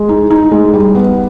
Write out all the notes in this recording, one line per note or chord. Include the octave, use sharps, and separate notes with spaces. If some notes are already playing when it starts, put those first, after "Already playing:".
Already playing: G#3
D#4
D#4
G#3
G3
B3